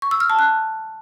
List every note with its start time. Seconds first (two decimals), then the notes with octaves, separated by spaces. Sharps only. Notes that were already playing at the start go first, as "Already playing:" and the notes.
0.02 C#6
0.11 E6
0.20 F6
0.30 A5
0.39 F#6